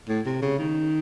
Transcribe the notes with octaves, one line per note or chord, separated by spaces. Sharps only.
A2
C3
C#3
D#3